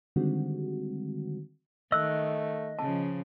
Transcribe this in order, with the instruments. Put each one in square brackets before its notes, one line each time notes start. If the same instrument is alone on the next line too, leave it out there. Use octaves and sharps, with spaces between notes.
[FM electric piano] D3 D#3 G3 G#3 C4 F#4
[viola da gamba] D#3 [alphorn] A3 [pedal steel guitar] D#5 F#6 [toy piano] E6
[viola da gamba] C#3 F3 [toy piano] A5